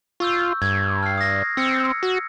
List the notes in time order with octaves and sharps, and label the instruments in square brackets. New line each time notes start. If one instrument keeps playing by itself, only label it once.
[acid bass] F4 [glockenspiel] C#6 E6 G6
[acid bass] G2 [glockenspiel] G#6
[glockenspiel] F6 C7
D#6 A#6
[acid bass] C4 [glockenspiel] E6 C#7
[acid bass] F#4